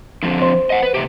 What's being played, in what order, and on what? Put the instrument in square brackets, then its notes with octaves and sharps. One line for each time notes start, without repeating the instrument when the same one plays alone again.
[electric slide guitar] D3 F3 C4
[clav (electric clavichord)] C5
[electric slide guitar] D#5 F#5
B4
A2 C3 G4